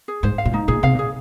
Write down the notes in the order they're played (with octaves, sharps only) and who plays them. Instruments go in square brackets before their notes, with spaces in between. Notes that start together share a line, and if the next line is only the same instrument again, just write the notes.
[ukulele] G#4
[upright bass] G#2 [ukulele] C5
[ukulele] F5
[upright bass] A#2
[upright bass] G#2 [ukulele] D#4
[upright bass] A#2 [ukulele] G#4
[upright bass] C3 [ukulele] F5
[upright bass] A#2 [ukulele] G#4